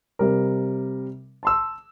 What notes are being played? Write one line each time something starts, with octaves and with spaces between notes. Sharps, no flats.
C3 G3 A#4
A5 C6 E6